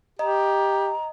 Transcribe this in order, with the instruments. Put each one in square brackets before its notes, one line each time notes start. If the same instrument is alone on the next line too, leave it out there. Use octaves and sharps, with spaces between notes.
[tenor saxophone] G4 [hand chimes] D#5 [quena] A#5